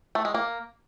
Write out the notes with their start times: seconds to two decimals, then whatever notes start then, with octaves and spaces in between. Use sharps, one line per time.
0.15 A3
0.25 G#3
0.34 A#3